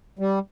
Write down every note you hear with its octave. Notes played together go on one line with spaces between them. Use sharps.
G3